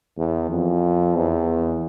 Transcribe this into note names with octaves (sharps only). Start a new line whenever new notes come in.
E2
F2
E2